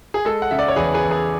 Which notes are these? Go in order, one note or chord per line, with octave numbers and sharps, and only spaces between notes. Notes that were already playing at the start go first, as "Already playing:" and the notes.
G#4
G#3 A4
F#5
C#3 E5
D5
C#5
E2 G#4 B4
G#4 B4
E2
G#4